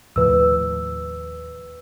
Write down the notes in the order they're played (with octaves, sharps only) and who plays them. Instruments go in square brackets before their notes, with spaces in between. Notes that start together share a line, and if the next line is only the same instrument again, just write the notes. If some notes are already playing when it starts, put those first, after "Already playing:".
[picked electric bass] D#2 A2 F3 [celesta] B4 E6